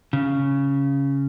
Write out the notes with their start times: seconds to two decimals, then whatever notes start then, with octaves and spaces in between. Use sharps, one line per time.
0.13 C#3